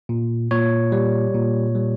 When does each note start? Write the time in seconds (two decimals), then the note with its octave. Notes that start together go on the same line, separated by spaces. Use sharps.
0.09 A#2
0.51 A#2 C#5
0.92 G3
1.35 A#2
1.75 G3